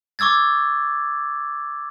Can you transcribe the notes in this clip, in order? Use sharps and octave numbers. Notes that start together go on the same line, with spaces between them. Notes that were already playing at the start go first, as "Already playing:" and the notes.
C#6 D6 E6 G#6 A6